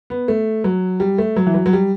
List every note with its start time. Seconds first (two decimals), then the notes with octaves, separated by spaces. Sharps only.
0.10 B3
0.28 A3
0.64 F#3
1.00 G3
1.18 A3
1.36 F#3
1.47 E3
1.54 F#3
1.66 F#3
1.73 G3